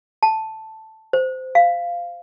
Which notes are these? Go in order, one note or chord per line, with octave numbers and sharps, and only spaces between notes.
A5
C5
F5